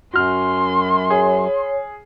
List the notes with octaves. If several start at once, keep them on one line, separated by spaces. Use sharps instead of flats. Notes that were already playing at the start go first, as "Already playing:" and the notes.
F#2 F#4 C6 F6
G#4 C#5